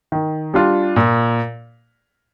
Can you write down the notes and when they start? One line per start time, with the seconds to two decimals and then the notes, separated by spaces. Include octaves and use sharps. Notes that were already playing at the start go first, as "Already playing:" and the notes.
0.12 D#3
0.54 G3 D4 F4
0.96 A#2